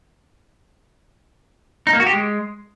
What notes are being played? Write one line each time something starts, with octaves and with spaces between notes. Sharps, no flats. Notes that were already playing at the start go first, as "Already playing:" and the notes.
D#4
A#3
F#4
G4
G#3